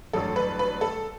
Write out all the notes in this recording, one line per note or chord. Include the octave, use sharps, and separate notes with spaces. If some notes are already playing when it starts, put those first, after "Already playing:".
A1 G2 F#3 A4
B4
B4
A4